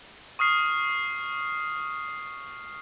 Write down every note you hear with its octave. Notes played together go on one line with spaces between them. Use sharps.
C#6 D#6 F6 C7